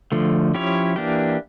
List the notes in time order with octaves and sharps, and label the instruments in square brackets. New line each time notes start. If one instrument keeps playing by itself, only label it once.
[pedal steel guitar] D3 F3 A3
F3 C#4 E4 G4 C#5
E3 A#3 D4 G4